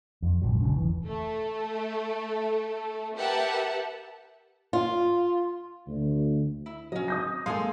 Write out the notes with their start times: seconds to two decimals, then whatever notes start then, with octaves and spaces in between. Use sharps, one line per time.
0.22 F2
0.42 A#1 G#2 F#3
0.61 F1 C2 C#3 C#4
0.77 E1 E3
1.06 A3 A4
3.16 G4 A#4 B4 E5 F#5 A5
4.73 F4
5.86 D2
6.66 E4
6.92 F#3 C#4 D#5
7.08 D#6 G6 A#6
7.46 G#3 A#3 A4 F5 G#5 C6